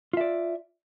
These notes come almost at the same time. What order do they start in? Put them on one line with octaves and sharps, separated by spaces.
F4 E5 D5